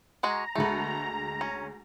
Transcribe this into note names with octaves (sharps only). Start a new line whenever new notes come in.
G#3 F#4 G#4 A#5
D2 G#3 A3 B3
C#4